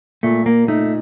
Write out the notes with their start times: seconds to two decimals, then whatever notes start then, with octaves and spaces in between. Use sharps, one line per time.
0.23 A#2 A3
0.46 A#3
0.68 A3 D#4